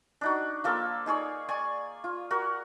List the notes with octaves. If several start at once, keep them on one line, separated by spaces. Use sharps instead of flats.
D4 D#4 F#4
F3 A#3 A4 D6
D#4 G#4 C#5 D5
D5 G#5 C#6
F4
F#4 A#4